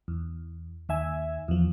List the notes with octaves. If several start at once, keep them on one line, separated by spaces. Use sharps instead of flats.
E2
D#2 E5 G#5
E2 F3